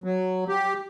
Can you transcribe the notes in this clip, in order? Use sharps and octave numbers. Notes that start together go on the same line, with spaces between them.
F#3
G4